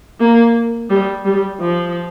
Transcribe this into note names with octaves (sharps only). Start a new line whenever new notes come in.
A#3
G3
G3
F3